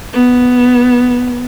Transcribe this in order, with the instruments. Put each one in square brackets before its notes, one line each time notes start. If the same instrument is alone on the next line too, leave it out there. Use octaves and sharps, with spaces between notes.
[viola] B3